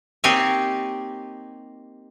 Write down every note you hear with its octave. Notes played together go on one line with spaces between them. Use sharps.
A#3 C4 D#4 G4 C#5 G#5